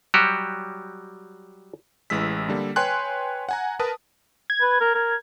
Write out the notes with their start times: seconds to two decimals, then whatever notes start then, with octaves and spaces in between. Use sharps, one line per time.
0.14 F#3 G3 F#4 G4
2.10 A1 E3 G#3 E6 B6
2.49 D3 G3 A#3
2.76 B4 C#5 G5 G#5 C6 F#6
3.49 F#5 G#5 A#5
3.79 A#4 B4 A5 D#6
4.50 G#6
4.61 B4
4.81 A#4
4.94 A#4